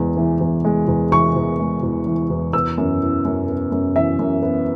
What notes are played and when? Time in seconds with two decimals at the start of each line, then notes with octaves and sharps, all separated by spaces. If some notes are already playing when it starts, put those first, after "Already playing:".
Already playing: E2 G#3
0.17 E3
0.41 E2
0.65 G#3
0.88 E2
1.12 E3 C#6
1.36 E2
1.59 G#3
1.83 E2
2.06 E3
2.30 E2
2.53 B3 E6
2.78 F#2
3.01 E3
3.25 F#2
3.48 B3
3.72 F#2
3.96 E3 E5
4.19 F#2
4.42 B3